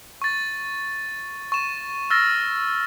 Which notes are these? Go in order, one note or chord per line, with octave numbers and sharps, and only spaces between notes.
C#6 A6
C#6 E7
E6 F6 A6 A#6